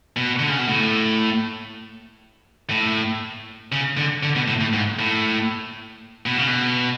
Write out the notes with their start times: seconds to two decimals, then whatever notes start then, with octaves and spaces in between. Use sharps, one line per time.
0.17 B2
0.39 D3
0.49 C#3
0.58 B2
0.68 A2
2.70 A2
3.72 C#3
3.97 D3
4.23 D3
4.36 B2
4.48 A2
4.60 A2
4.73 G#2
4.99 A2
6.26 B2
6.37 C#3
6.48 B2